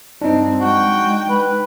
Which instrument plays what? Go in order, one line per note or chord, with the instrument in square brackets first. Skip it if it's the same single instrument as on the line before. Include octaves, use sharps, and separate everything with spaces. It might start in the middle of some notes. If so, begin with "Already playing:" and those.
[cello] G2 C4 [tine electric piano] D4 D#4
[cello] G#3 G5 [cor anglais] F#4
[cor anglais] B4